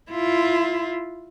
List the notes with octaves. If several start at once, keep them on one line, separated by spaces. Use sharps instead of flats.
E4 F4